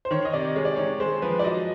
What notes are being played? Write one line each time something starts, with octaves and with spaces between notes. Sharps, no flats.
C5
D#3 C#5
D#5
C3 D5
G#3 C#5
D5
D#3 C#5
G#3 C5
F3 B4
D5
F#3 D#5